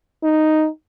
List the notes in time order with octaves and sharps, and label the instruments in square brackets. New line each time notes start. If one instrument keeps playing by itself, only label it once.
[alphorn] D#4